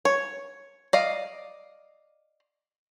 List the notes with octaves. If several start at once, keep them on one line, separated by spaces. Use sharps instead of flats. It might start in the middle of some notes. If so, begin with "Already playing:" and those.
C#5
D5 D#5 F5